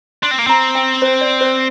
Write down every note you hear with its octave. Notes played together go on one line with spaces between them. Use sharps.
D4 C6
C4
A#3
C4 A#5
G5
C5
D5
C5